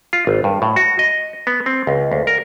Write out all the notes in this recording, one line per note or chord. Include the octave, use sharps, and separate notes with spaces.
F4
G#1
G2
A2
F#4
D#5
B3
C4
C#2
D2
A#4